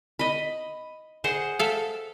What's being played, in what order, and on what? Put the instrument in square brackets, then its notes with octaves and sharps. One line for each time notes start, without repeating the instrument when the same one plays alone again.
[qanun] D#5 B5
G#4 C5 F#5
[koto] A4 E5 F5